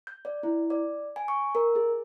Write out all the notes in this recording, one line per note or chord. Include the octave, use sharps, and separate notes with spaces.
G6
D5
E4
D5
G#5
C#6
A#4
G#4